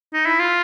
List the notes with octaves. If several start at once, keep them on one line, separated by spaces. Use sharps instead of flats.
D#4
E4
F4